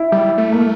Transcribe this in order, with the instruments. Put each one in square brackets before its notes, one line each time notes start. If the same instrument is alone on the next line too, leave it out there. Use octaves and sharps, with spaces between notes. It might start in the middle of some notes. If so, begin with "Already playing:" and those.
Already playing: [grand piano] E4
[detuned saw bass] G3
A3
[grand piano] A#3